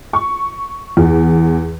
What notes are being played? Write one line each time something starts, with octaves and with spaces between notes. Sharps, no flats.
C#6
E2